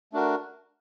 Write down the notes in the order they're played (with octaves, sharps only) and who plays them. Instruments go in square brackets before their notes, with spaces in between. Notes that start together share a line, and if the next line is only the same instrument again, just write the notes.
[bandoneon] A3 D4 F#4 A#4